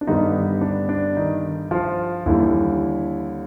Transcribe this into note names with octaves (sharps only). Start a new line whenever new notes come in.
D4
G2 D3 D#3 G3 B3 D#4
D4
D4
D#3 D#4
F3 F4
D#2 D3 E3 G3 E4